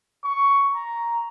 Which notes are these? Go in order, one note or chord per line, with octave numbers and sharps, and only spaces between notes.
C#6
A#5